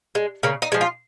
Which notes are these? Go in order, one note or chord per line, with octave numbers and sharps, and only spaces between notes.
G#3
C#3 A#3
D#4
F3 G#3
F4